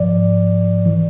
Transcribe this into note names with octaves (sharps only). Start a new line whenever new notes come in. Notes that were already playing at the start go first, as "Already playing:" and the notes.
Already playing: G#2 F3 D5
E3